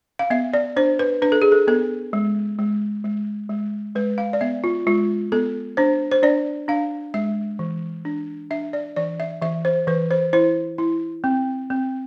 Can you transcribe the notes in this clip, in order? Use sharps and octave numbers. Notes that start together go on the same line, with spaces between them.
F5
B3 E5
D5
D4 C5
B4
D4 B4
A4
G#4
A4
B3 A4
G#3
G#3
G#3
G#3
G#3 B4
F5
D5
B3 E5
F4
G#3 F4
B3 A4
D4 C5
C5
D4 D5
D4 F5
G#3 E5
E3
D4
D4 E5
D5
E3 D5
E5
E3 E5
C5
E3 B4
C5
E4 C5
E4
C4
C4